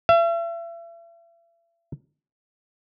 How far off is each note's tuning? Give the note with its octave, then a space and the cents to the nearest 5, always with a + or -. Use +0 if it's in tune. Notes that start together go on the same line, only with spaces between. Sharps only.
E5 +40